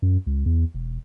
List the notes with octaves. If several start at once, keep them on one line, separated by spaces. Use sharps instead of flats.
F#2
C#2
E2
E1